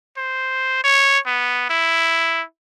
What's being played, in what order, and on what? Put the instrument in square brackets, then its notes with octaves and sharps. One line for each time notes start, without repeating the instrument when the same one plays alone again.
[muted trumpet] C5
C#5
B3
E4